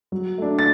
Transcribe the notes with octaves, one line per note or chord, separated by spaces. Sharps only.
F#3
A3 D4
A6